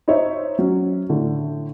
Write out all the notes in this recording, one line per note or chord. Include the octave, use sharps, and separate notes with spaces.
D#4 C5 C#5 E5
F#3 C#4
A2 D3